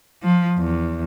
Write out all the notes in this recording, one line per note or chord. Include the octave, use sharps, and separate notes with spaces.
F3
E2